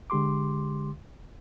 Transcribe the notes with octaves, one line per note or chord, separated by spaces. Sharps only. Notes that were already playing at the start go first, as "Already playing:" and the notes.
D3 G#3 G4 C6 D6